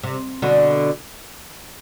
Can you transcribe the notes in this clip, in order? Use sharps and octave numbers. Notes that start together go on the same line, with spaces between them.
C3
B2 D3